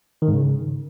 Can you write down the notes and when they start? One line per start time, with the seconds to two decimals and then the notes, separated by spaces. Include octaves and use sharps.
0.22 D#3
0.28 G#2
0.34 C#3